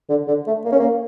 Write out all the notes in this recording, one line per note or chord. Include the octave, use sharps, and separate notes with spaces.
D3
D3
A3
A#3
C#4
A#3